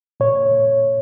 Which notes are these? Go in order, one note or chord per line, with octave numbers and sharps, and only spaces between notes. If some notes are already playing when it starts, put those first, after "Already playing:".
A#2 C#5